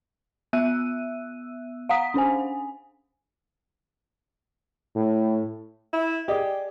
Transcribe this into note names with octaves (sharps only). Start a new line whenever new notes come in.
B3 E5 E6 F#6 D#7
F5 F#5 A#5 D#6 B6
C#4 D4 C5 G#5
A2
E4
G4 G#4 D5 D#5